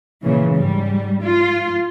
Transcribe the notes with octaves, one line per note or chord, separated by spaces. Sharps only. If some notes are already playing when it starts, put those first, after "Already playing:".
A#2 C#3 E3
G#2 G3
F4